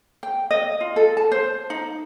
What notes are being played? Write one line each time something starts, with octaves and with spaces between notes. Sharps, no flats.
G5
D#5
F4
A4
A5
C5
D#4